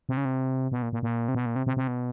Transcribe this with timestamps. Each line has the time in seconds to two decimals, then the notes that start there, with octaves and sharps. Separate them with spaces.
0.09 C3
0.17 C#3
0.25 C3
0.72 B2
0.82 A#2
0.93 A#2
1.03 A#2
1.28 C3
1.35 B2
1.46 A#2
1.56 C3
1.67 C3
1.77 C3
1.88 B2